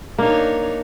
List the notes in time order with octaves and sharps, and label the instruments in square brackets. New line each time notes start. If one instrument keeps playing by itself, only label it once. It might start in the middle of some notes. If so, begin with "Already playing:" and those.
[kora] A#3 [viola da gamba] D4 D#4 C#5